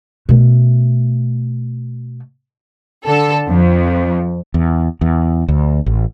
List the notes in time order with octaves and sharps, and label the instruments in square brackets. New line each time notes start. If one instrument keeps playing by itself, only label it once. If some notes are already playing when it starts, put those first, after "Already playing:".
[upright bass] B2 A3
[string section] D3 A4
F2
[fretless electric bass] E2
E2
D2
A1